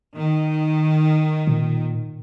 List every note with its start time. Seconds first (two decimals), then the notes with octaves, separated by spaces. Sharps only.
0.16 D#3
1.47 A#2